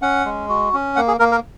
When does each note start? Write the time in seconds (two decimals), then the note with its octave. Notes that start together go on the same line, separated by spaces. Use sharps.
0.02 C#4 F#5
0.25 G#3
0.49 F#4
0.73 C#4
0.96 A#3 F#5
1.08 G#4
1.19 A#3 A#4
1.31 A#4